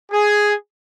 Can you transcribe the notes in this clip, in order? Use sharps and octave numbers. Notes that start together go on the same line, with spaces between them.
G#4